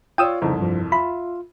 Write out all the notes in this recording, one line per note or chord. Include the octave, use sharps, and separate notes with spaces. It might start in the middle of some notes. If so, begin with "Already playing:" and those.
F4 C#5 D5 G5 D#6 E6
C2 F2 C#3 E3 D#4 C5
G2 F3
F4 E5 B5